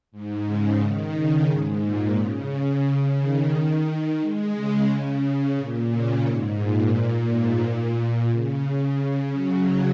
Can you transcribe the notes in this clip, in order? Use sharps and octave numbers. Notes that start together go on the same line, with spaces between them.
G#2
C#3
D#3
C#3
G#2
A#2
C#3
D#3
G#3
C#3
C#3
C#3
A#2
C#3
G#2
A#2
A#2
G#2
A#2
C#3
C#3
F#3